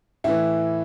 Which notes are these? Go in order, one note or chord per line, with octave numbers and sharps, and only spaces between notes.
A2 E3 E4